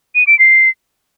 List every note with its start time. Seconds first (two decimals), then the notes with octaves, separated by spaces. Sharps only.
0.15 D#7
0.27 D7
0.39 C7